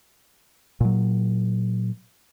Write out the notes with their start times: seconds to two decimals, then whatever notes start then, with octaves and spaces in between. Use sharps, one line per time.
0.80 A#2 F#3